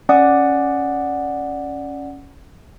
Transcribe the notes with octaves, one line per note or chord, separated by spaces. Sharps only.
C#4 D5 F#5 D#6